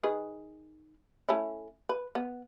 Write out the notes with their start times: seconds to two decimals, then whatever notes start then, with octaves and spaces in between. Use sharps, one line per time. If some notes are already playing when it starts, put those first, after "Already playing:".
0.03 D#3 G#4 B4
1.29 A3 C#4 E4
1.89 B4
2.15 B3